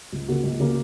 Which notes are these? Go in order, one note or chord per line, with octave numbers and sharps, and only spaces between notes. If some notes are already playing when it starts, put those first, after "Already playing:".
C#2
C#3 A#3 F#4
C#2
C#3 A#3 F#4